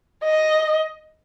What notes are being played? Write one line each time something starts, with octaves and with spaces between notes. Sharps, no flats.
D#5